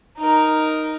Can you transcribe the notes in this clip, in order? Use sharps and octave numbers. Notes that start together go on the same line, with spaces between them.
D#4 A#4